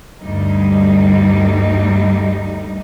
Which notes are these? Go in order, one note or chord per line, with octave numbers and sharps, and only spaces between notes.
D2 G2 G3 D#4